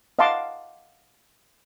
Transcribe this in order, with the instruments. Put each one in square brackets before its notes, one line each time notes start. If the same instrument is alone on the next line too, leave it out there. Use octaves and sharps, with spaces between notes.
[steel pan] D#5 F5 F#5 A5 C6 D6